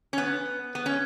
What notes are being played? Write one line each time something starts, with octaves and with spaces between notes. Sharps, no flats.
C#4
B3
B3
C#4